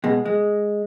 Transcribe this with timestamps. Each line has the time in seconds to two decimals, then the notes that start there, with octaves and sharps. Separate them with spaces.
0.04 B2 G#3
0.26 G#3